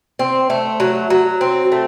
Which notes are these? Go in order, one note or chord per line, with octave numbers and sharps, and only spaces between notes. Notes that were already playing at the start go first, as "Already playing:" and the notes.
C4
A3
F#3
F#3
C4
A3